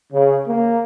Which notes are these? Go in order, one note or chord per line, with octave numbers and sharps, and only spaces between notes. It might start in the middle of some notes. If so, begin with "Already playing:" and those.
C#3
A#3